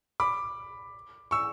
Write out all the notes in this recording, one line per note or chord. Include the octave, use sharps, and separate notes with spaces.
B5 D6
C#6 E6